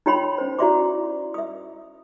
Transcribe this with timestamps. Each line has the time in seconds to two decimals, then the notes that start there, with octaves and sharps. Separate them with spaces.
0.06 D#4 F4 C#5 G5 B5 C6
0.38 C#4 C5
0.59 E4 F#4 D5 E5 C6 D6
1.34 E5 D#6